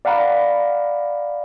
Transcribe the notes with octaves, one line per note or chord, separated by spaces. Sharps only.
D5 F5 F#5 A#5 B5